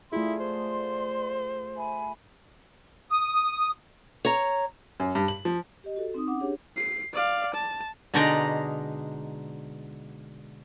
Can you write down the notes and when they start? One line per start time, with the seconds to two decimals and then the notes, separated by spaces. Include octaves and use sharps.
0.12 A3 E4 F4 G#4 D5 C6
0.40 C5
1.77 E5 G#5 B5
3.11 D#6
4.25 C#5 A#5
5.00 F#2
5.15 G2
5.28 F#7
5.45 F3
5.84 G4 D#5
5.96 F#4 A4
6.14 C4 D#4 D#6
6.27 C#4 F#5 D6
6.40 D4 G4 G#4 C#5
6.77 C7
7.13 D5 F5
7.54 A5
8.14 B2 D3 G#3 D#4 D5 A#5